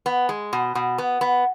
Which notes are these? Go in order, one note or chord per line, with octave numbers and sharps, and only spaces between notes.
B3
G#3
B2
B2
B3
B3